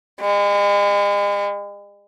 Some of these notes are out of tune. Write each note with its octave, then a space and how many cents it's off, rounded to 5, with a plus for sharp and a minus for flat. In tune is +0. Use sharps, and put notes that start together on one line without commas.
G#3 -40